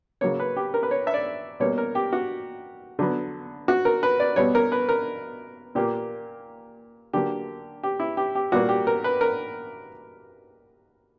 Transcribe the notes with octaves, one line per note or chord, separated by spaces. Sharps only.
C#3 F#3 A#3 C#5
B4
G4
A#4
B4
C#5
E5
D5
B2 G3 A#3 C#5
A#4
G4
F#4
D3 F#3 B3
F#4
A#4
B4
D5
B2 G3 B3 C#5
A#4
B4
A#4
A#2 A#3 G4
D3 F#3 A#3 G4
G4
E4
G4
G4
A#2 G3 A#3 F#4
G4
A#4
B4
A#4